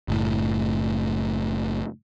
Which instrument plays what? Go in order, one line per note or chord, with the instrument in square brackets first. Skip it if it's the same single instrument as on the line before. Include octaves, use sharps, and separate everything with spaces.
[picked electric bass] F#1 A2